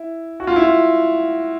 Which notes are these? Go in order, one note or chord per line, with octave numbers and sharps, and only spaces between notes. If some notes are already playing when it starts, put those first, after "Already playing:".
Already playing: E4
F#4
F4
E4
F4